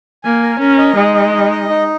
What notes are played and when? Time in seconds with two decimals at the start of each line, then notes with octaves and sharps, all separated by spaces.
0.24 A#3 G#5
0.42 A#4
0.60 C#4 A#4
0.78 D#5
0.96 G#3 D#4
1.15 D#5
1.33 D#4
1.51 D#5
1.69 D#4